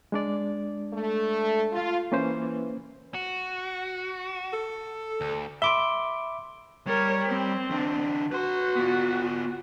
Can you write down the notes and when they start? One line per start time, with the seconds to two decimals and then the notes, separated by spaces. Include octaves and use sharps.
0.12 G#3 D4 D5
0.93 A3
1.72 F4
2.12 E3 A#3 C#4 C5
3.14 F#4
4.53 A4
5.21 D2
5.62 E5 B5 C6 D6 D7 G7
6.87 G3 A#4 C#5
7.27 C4
7.70 D#3 D4
8.32 F#4 B4 C6
8.76 B3 F4